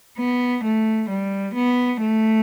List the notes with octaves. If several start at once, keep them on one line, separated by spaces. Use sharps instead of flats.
B3
A3
G3
B3
A3